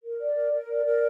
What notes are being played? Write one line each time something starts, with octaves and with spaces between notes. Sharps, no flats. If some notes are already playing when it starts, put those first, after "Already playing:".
A#4
D5
A#4
A#4
D5
A#4